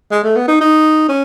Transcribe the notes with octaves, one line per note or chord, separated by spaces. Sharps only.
G#3
A3
B3
D#4
D#4
C#4